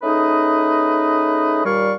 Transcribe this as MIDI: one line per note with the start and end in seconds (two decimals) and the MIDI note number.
0.03 1.65 57
0.03 1.65 61
0.03 1.65 63
0.03 1.65 68
0.03 1.65 71
0.03 1.65 75
1.65 1.93 39
1.65 1.93 46
1.65 1.93 55
1.65 1.93 74
1.65 1.93 77
1.65 1.93 85